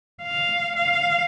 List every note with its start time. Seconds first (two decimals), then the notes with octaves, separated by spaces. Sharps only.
0.23 F5
0.76 F5